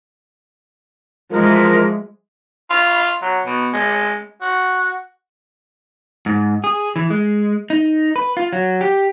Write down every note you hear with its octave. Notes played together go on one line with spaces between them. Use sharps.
E3 F3 G#3 A#4
F4
F#3
B2
G#3
F#4
G#2
G#4
E3
G#3
D#4
B4
F4
F#3
G4